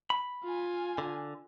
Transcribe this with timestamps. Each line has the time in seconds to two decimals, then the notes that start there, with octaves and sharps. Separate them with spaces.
0.10 B5
0.44 F4 G#5
0.98 D3